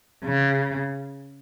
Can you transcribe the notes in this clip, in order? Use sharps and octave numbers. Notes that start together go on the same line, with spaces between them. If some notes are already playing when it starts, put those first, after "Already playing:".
C#3